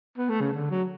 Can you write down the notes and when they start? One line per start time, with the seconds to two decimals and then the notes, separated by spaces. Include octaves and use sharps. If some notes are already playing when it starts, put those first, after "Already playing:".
0.18 B3
0.29 A3
0.41 C#3
0.53 D3
0.70 F#3